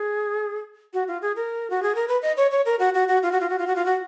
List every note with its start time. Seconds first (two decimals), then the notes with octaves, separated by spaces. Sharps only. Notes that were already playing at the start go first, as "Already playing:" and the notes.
Already playing: G#4
0.94 F#4
1.08 F4
1.22 G#4
1.36 A#4
1.70 F#4
1.83 G#4
1.95 A#4
2.08 B4
2.22 D#5
2.37 C#5
2.51 C#5
2.66 A#4
2.79 F#4
2.94 F#4
3.08 F#4
3.23 F4
3.32 F#4
3.41 F4
3.50 F#4
3.59 F4
3.67 F#4
3.76 F4
3.86 F#4